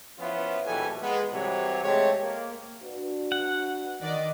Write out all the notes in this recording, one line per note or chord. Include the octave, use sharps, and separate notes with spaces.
F3 B3 C#4 E4 F4
A#1 B2 E3 G3 A4 G#5
G#3 B3
C2 C3 E3 F#3 C4 C#5
G#3 A3 C4 G4 C#5
A#3
D4 F#4 B4
F#5
D#3 D5 D#5